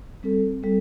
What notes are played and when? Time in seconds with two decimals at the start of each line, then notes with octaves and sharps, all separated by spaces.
0.23 G3 C4 A4
0.63 G3 C4 A4